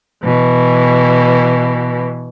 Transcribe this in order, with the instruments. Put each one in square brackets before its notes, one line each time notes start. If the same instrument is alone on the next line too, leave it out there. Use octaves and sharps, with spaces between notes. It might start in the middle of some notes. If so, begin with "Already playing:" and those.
[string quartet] B2 E3